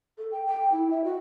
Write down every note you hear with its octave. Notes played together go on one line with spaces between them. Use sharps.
A4
G5
G5
E4
E5
F#4